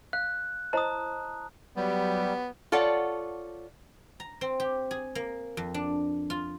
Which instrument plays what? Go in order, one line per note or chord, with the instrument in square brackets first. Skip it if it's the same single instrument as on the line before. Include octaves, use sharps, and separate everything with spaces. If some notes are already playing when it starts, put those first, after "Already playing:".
[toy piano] F5 [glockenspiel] F#6
[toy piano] E4 C5 D#5 [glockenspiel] A5 A#5 D#6
[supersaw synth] F#3 G4 [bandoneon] G3 [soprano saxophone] B3
[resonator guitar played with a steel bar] F4 A4 C#5 D5 F#5
[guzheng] A#5
C4
G4
G#4
A#3
F2
D4
F4